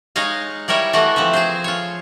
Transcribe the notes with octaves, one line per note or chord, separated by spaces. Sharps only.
G#3 D#4 C#5 D#5 F5
G3 E4 A#4 C#5 E5
E3 A3 F#4 B4 D#5
F3 C4 B4 E5
G#4 C5
F4 C#5